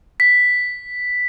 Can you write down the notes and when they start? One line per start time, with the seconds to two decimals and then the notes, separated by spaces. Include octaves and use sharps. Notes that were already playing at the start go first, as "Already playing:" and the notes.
0.20 B6